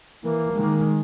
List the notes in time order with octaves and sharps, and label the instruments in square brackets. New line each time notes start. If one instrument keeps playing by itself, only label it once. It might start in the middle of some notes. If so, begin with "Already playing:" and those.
[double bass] E3 [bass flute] A#3
[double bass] D#3 G#3